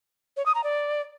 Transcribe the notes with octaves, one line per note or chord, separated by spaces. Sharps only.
C#5
D#6
A#5
D5